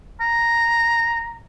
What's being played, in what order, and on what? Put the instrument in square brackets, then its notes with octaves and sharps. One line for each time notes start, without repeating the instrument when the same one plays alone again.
[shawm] A#5